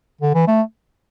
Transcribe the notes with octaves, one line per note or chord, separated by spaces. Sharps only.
D3
E3
A3